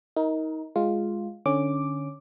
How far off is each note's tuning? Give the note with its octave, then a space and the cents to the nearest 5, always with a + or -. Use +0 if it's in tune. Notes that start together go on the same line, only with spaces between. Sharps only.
D#4 +25 A#4 +0
G#3 +0 F4 +0
D3 +15 C#4 +0 D6 +0